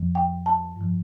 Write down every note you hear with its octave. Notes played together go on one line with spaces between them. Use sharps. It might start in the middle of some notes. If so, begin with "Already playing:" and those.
Already playing: F2 F3
G5
A5
G2 F3